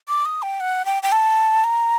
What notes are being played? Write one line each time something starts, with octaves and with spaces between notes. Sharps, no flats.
D6
D#6
G5
F#5
G5
G5
A5
A#5